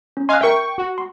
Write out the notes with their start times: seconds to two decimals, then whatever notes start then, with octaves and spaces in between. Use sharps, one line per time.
0.17 C#4
0.29 D#5 F5 G#5 C6 F#6
0.41 A#4 E5 G5 C#6
0.78 F#4
0.98 C6